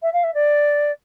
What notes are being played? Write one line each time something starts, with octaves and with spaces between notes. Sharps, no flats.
E5
F5
E5
D5